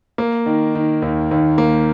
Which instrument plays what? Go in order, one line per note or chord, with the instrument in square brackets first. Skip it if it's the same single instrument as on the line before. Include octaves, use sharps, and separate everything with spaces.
[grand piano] A#3
D#3
D#3
D#2
D#2
A#3